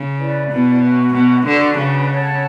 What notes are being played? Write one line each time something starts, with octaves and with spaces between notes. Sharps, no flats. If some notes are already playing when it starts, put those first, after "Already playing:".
Already playing: C#3
E4 B4 D5
B2
C#4 F#4 B4 E5
B2
D3 D4 F#4 B4
C#3
A4 C#5 F#5 A5